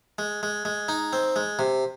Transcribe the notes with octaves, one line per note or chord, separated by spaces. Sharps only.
G#3
G#3
G#3
D#4
C4
G#3
C3